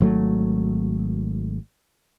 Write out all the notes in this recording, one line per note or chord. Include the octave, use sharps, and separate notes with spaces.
G#1 F#3 A3